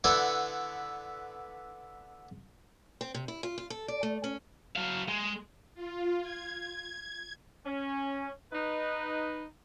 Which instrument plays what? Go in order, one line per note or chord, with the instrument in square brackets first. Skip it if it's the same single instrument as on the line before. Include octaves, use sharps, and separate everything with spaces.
[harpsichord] D3 B3 E4 B4 D5 F#5
[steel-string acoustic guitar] C4
C3
E4
F4
F4
A4
D5
A3
C#4
[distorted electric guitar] F#3 F5
G#3
[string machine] F4
G#6
[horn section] C#4
D#4 B4